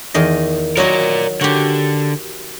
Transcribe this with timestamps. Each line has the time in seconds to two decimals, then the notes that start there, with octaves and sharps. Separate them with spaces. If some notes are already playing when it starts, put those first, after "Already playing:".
0.14 E2 D#3 D#5
0.77 F#3 F#4 A#4 D5 D#5
1.41 D3 F#4 G4